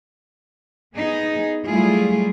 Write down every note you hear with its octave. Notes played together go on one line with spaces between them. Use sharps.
B3 D#4 G#4
F#3 G3 A3 E4 F4 G#4